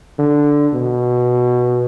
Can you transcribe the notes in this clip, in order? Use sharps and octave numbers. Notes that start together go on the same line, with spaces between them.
D3
B2